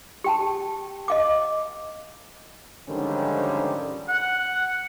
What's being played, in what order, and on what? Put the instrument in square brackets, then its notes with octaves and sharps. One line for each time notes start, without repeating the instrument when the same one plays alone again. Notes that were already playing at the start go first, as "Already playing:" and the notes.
[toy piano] G4 G5 A5
D#5 F5 D6
[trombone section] G#2 D3 D#3 F3 G3 C#4
[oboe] F#5